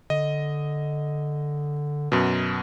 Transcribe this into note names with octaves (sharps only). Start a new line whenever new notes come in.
D3 D#5
F#2 B2